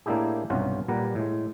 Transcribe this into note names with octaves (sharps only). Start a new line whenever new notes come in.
A2 A#3 D4 E4 G4 G#4
B1 G2 C3 C#4 F4 F#5
A#2 G3 B4 F#5 A#5
A2 G#3